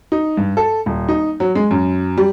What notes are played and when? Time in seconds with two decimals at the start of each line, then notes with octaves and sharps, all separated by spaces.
0.12 D#4
0.37 G2
0.57 A4
0.86 D#1
1.08 D#4
1.40 F#3
1.55 G#3
1.71 F#2
2.18 G3